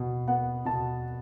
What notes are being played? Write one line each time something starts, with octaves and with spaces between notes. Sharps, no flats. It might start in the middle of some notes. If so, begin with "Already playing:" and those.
Already playing: B2 B3
B3 F#5
B2 A5